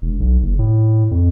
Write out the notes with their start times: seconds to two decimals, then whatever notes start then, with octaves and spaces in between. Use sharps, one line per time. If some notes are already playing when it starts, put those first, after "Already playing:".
0.02 E1
0.20 B1
0.43 F#1
0.59 A2
1.11 F2